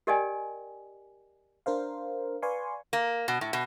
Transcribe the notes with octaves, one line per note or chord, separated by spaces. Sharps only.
G4 A#4 D5 D#5 G5 G#5
D4 A#4 C5 F5
B4 D5 F5 G#5 C6 C#6
A#3
B2
A2
B2